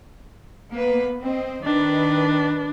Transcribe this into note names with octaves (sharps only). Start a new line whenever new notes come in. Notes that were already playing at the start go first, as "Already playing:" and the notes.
A#3 B3 B4
C4 D#5
D#3 D4 B4